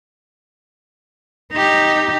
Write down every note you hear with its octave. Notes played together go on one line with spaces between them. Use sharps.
D#4 G4